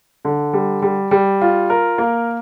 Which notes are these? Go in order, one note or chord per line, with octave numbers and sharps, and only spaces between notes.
D3
G3
G3
G3
F4
A#4
A#3